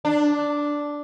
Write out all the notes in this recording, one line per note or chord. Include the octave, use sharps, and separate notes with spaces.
D4